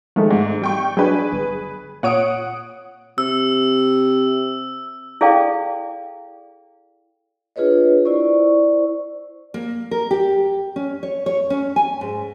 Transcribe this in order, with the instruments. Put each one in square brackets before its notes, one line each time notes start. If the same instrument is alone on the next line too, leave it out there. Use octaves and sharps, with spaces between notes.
[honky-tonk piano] D#3 [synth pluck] F3 G#3 A3
[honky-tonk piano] G#2
G3 G5 C#6
[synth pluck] F#3 D4 [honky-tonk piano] G#4 B4
[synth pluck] G1
[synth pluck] A#2 C#5 D7 [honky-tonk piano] F#5 D#6
[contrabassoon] C3 [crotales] E6
[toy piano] E4 G#4 A4 D5 F5 G5
[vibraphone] D4 F4 G#4 B4 C#5 D#5
E4 C5 D5 C#6
[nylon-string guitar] A#3
A#4
G4
C#4
C#5
C#5
C#4
G#5
G#2